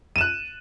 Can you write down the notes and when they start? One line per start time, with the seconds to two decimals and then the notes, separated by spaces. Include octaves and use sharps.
0.16 D#7
0.18 E7
0.21 F#6